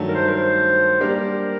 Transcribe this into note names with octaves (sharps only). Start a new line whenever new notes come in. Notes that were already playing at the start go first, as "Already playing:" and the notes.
Already playing: G2 D#3 F#3 A3
A#4
C5
A#4
C5
G3 A#3 D4 G4 A#4